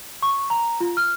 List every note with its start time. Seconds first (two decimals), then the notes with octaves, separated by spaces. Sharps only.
0.22 C#6
0.50 A#5
0.80 F4
0.97 F6